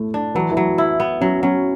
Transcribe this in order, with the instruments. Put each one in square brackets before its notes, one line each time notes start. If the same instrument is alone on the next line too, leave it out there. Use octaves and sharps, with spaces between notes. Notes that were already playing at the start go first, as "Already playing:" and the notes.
Already playing: [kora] A2 [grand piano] A3 A4
[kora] D4
[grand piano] E3 E4 [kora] F#3
[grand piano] E3 E4
[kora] F#3
E4
B3
[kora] F#3 [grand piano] C#4
[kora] F#3 [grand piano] C#4